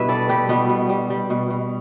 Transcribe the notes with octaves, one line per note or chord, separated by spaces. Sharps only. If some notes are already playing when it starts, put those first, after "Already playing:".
Already playing: G2 B2 E4 B4 E5
G3 A4 D5
G3 G4 B4
B2 G3 B3
B2
G3
G3
B2
B2